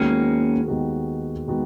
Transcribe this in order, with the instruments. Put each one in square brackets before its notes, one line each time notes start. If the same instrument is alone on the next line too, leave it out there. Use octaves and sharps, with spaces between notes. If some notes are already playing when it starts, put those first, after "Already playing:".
Already playing: [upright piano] D#2 D#3 G#3 B3 F#4 [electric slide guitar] A#3 C#4
[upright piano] D#2 D#3 G#3 B3 F#4
D#3 G#3 B3 F#4